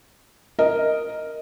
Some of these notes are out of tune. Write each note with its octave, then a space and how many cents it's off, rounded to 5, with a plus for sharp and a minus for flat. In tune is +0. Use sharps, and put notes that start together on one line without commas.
A#4 +0 D#5 +0